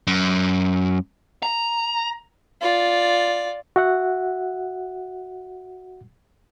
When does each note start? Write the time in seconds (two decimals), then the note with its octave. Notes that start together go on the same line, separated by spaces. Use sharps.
0.07 F#2
1.43 A#5
2.61 F4 D5
3.76 F#4 E5 F#5